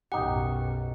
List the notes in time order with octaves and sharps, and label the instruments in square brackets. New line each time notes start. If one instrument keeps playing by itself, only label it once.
[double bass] B1 F#2 [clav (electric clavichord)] D#4 G4 [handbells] F#5